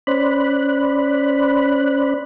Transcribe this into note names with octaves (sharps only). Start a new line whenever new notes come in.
C#4 C5 D5 B5 F#6